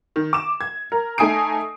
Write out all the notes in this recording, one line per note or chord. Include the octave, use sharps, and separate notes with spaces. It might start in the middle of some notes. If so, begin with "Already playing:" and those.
D#3
D6 E7
G#6
A#4
A3 D#4 G#5 D#6 C7 D7